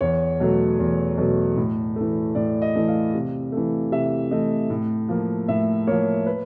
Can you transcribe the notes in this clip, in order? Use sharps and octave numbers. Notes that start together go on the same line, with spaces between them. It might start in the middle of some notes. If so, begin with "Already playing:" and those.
E2 C#5
B2 F#3 A3
E2
B2 F#3 A3
A2
A3
E3
A2 D5
D#5
E3 A3
F5
C3
E3 A3
C3 E5
E3 A3 D#5
A2
F3 A#3
A2 E5
F3 A#3 C#5
B4